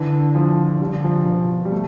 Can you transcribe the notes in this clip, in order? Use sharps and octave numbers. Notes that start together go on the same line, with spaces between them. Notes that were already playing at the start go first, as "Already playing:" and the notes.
Already playing: D3 E3
F3
D3 G3
F3
B2 F3
G3
A3